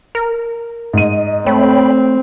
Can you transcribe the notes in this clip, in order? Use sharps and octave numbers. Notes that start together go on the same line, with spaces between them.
A#4
G#2 D#5 D#7
A3 C4 C#5 G5 B5